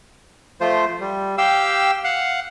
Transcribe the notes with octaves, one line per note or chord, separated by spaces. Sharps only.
F3 A3 F4 C5
G3
G4 F5 G5 E6
F5 F#5